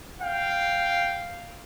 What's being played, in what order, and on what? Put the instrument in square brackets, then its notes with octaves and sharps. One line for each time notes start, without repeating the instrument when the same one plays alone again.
[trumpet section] F5 G5